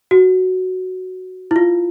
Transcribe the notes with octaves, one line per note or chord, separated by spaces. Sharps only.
F#4
E4
F4